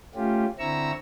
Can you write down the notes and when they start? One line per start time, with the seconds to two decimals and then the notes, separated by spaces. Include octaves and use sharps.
0.15 A3 C#4 F4 G4
0.59 D3 C4 E4 A#5 C#6 E6